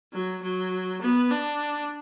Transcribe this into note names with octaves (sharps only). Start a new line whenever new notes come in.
F#3
F#3
B3
D4